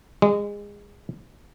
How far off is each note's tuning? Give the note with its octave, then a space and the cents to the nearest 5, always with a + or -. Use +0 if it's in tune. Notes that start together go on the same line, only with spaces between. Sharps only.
G#3 -25